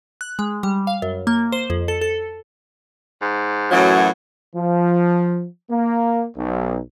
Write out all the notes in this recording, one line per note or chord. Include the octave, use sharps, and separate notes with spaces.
F#6
G#3
G3
F5
F#2
A#3
C5
F2
A4
A4
G#2
F#2 A2 E3 F#3
F3
A#3
B1